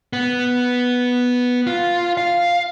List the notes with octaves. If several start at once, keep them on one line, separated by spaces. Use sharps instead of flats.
B3
F4
F5